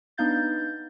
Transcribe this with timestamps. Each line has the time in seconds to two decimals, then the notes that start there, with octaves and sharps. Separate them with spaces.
0.18 B3 D4 D#4 F5 G6 A6